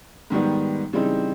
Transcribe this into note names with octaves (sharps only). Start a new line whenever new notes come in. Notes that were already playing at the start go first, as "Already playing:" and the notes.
G#2 D#3 G3 B3
C#3 E3 G3 C4 D#4